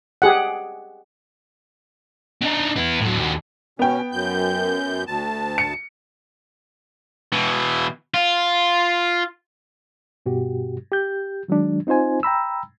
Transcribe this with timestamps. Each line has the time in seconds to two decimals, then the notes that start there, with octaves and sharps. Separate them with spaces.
0.22 G4 G#4 F#5
2.41 D4 D#4
2.76 B3 E4
3.01 A2 F#3
3.18 D#2 F#4
3.79 B2 B3 C#4 G5
4.12 F#2 G6
5.07 D2 A5
5.58 C#7
7.33 B2 E3
8.14 F4
10.26 G2 B2 F#4 G4
10.92 G4 G6
11.48 D#3 F#3 G#3 D4
11.87 C4 D#4 F4 C5 G#5
12.23 G5 A#5 B5 E6